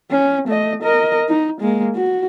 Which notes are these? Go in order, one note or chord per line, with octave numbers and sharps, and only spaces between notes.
C#4
A3 D#5
A#4 D#5
D#4
G#3 A#3
F#4